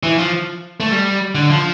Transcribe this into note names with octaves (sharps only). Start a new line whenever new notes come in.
E3
F3
A3
G3
D3
F3